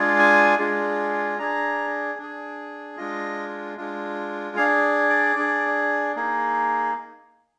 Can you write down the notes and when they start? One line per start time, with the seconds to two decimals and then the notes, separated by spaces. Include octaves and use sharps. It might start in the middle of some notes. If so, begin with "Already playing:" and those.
Already playing: G#3 D4 F4 G#4
0.19 G#5
0.59 G#3 D4 F4 G#4
1.39 D4 G#4 A#5
2.19 D4 G#4
2.97 G#3 D4 F4 D#5
3.77 G#3 D4 F4
4.56 D4 G#4 F5
5.09 D5
5.36 D4 G#4
6.16 A#3 D#4 G#4